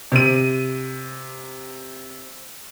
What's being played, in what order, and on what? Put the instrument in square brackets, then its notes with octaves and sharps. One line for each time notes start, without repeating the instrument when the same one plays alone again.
[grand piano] C3 D#7